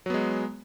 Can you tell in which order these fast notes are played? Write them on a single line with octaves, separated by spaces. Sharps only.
F#3 B3 G#3